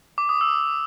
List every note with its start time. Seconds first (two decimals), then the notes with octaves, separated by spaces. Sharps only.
0.18 D6
0.29 D#6
0.41 E6